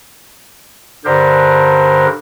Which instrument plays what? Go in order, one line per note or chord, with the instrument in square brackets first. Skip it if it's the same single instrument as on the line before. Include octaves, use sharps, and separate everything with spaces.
[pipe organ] G2 D3 G4 A#4 C5